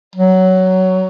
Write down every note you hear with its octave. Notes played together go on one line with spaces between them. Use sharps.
F#3